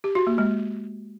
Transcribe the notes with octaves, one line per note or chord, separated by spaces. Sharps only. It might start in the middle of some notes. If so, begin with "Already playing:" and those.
G4
F#4
A#3
G#3